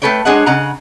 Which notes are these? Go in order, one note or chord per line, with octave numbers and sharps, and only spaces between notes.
A3 A#3 A4 B4 C#5 G5
G#3 D4 G#4 C#5 D#5 F#5
C#3 D#5 F#5 A#5